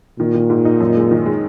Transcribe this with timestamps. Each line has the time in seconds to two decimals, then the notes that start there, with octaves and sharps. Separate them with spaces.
0.19 A#2 D#3
0.35 D#3
0.50 G#2
0.65 D#4
0.80 F#2
0.96 G#3
1.11 D#3
1.26 G#3